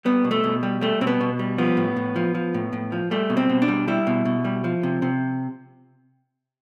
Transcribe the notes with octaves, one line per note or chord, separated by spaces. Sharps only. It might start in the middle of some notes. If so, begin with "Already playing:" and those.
G3 B3
B2
A3
B2
G3
G3 A3
B2 C4
B3
B2
G3
F3 B3
A2
A2
F3
F3
A2
A2
F3
G3 A3
B2
C4
B2
D4
G3
G3 E4
B2
B2
G3
F3
C3
C3